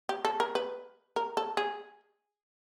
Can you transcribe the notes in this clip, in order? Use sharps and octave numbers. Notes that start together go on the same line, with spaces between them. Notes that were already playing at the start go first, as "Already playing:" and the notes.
G4
A4
A#4
B4
A#4
A4
G#4